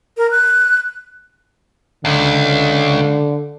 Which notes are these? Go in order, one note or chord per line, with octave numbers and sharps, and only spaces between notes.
A#4
F#6
C#2 D3